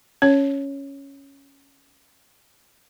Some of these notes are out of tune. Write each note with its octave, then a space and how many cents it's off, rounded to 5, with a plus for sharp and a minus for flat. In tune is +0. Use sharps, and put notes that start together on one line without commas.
C#4 +0 C#5 +0